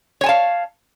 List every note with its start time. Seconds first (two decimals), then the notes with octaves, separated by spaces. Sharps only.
0.21 C#5
0.24 G#5
0.26 A5
0.29 F5